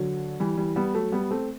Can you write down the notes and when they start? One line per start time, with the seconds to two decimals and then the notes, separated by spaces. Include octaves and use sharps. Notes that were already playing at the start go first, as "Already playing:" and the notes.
Already playing: D3 F#3
0.40 E3 G3
0.57 E3 G3
0.76 G3 B3
0.94 F#3 A3
1.12 G3 B3
1.31 A3 C4